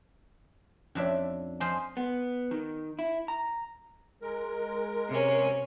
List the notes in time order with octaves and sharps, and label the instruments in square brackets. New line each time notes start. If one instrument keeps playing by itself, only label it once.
[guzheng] F2 D4 E5 [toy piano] C#4 F4 C#5
[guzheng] F3 C5 D#5 [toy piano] G#5
[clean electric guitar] B3
D#3
E4
A#5
[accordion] G#3 A#4
[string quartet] C3 C#4